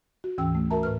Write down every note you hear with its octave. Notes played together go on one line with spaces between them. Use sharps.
F#4
D2 G#2 E3 C#4 G5 E6
A3
F#4 A#4 E5 A5 A#5
A2 B4 F6